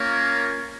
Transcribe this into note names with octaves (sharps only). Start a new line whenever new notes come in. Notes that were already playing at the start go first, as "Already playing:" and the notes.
Already playing: A#3 C#4 F4 A#4 C#5